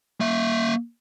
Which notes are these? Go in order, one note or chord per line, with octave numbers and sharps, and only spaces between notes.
A#3 E5